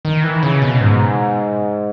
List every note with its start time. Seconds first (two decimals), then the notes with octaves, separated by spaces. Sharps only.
0.05 D#3
0.24 E3
0.43 C#3
0.62 B2
0.81 G#2